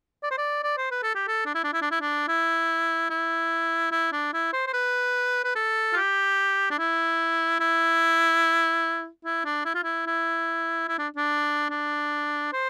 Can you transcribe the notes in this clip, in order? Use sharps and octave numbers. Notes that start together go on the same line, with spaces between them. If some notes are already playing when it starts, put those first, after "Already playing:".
D5
C5
D5
D5
C5
B4
A4
G4
A4
D4
E4
D4
E4
D4
E4
D4
E4
E4
E4
D4
E4
C5
C5
B4
B4
A4
F4
G4
D4
E4
E4
E4
D4
E4
F4
E4
E4
E4
D4
D4
D4
C5